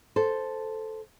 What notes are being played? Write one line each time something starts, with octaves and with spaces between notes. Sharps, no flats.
A4 C5